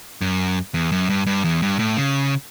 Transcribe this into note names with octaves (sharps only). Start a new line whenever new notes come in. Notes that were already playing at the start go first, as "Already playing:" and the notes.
F#2
E2
F#2
G2
G2
E2
G2
A2
C#3